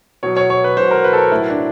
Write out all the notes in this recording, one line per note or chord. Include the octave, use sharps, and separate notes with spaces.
B2 F#3 C#5
C#5
C#5
B4
B2 F#3 C5
A#4
B4
A4
A#4
A2 F#3 E4
D4